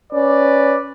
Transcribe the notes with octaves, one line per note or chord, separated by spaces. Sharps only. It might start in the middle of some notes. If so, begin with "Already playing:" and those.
C#4 B4 D5